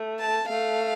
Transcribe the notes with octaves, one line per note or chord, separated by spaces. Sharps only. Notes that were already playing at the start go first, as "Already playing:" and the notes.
Already playing: A3
A5
A3 F5